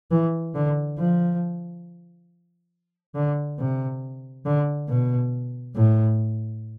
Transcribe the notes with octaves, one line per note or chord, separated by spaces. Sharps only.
E3
D3
F3
D3
C3
D3
B2
A2